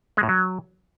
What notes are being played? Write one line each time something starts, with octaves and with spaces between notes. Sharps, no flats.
G#3
A2
F#3